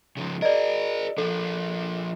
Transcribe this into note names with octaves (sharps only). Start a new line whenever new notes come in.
C#3 F3
G#4 A#4 D5 D#5
F3 D4 A4